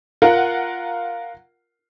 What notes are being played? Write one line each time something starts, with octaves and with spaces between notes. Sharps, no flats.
F4 A#4 F#5